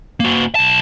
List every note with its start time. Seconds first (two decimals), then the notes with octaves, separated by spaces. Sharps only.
0.20 A#3 F#4
0.55 B1 A5